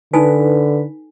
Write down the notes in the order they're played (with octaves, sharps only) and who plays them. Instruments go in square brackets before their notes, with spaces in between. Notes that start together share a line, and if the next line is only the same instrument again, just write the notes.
[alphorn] D3 [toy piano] D#4 A4 G#5 [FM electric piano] B4